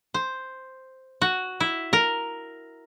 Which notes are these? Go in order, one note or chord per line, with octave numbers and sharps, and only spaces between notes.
C5
F#4
E4
A#4